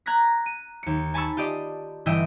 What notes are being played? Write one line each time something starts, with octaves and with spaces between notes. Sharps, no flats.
A#5 F#6 G#6 A#6 B6
D#7
D#2 C#7
G#5 A5 B5 C#6 E6
F4 G4 D5 D#5
G1 E3 D#5 G5 E6 D7